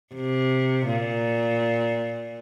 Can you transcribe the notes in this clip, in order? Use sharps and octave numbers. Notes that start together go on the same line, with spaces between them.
C3
A#2